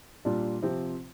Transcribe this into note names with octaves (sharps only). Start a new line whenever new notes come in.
A#2 G3 D4 F4
C3 F3 C4 G4